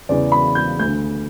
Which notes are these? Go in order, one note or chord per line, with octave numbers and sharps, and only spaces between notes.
E2 C#3 E3 D5
B5
G6
D2 D3 G6